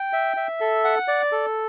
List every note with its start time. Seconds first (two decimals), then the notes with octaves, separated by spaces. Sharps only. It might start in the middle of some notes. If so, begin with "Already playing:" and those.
Already playing: G5
0.13 E5
0.37 E5
0.60 A4
0.84 F#5
1.08 D5
1.32 A4